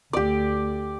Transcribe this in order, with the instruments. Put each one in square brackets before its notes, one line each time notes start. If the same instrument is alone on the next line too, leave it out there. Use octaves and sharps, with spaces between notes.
[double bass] D2 A3 [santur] G4 D5